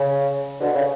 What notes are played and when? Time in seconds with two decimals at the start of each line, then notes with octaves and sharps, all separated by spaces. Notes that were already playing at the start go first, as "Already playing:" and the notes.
Already playing: C#3
0.60 B2 D3
0.75 C#3